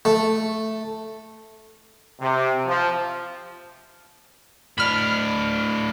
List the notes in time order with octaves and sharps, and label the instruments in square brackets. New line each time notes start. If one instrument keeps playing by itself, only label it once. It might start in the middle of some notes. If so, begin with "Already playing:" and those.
[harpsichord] A3
[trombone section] C3
F3
[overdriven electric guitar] A2 D4 [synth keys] B5 F6